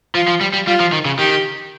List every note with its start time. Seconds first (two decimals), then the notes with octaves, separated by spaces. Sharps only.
0.15 F3 F4
0.28 F3
0.41 G3
0.53 G3
0.67 G3 F4
0.80 F3
0.93 D#3
1.05 C#3
1.18 D#3 G4